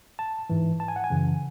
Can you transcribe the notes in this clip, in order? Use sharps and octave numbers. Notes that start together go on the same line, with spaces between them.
A5
G#2 E3
A5
G#5
F#5
G#5
F#2 C#3 E3